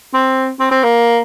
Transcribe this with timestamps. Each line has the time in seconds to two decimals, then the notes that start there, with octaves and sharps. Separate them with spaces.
0.14 C4
0.60 C4
0.71 C4
0.84 A#3